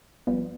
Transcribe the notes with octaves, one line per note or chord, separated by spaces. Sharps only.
G1 G2 F3 B3